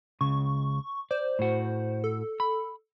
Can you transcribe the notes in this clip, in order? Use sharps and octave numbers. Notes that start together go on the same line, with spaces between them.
C#2 C#3 C#6
C5 D5
A2 F#4
A4
B5